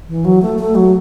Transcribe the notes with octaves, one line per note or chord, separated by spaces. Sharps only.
E3
F#3
A3
A3
F#3